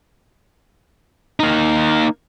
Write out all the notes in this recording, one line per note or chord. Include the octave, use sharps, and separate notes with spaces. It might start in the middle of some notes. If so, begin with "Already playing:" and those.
A#3 D#4